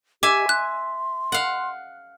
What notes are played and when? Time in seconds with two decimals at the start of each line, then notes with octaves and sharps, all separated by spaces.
0.23 G4 E5 G#5 D6
0.49 C6 F#6
1.32 F5 F#5